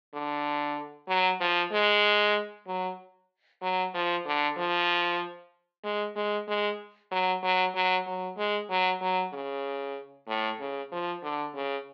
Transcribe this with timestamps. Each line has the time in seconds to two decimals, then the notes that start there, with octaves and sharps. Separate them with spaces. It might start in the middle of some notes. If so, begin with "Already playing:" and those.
0.13 D3
1.08 F#3
1.40 F3
1.72 G#3
2.67 F#3
3.62 F#3
3.94 F3
4.26 D3
4.57 F3
5.84 G#3
6.16 G#3
6.47 G#3
7.11 F#3
7.43 F#3
7.75 F#3
8.06 F#3
8.38 G#3
8.69 F#3
9.01 F#3
9.33 C#3
10.28 A2
10.60 C#3
10.92 F3
11.23 D3
11.55 C#3